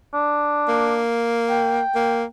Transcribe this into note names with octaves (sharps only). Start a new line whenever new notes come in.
D4
A#3
G5
A#3